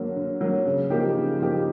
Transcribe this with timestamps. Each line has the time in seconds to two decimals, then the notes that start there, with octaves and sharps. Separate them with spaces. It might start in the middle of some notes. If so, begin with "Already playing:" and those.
Already playing: D3 F#3 A#3
0.16 D3
0.41 F#3 A#3
0.65 C#3
0.90 F3 A#3 D#4 G4
1.15 C#3
1.39 F3 A#3 D#4 G4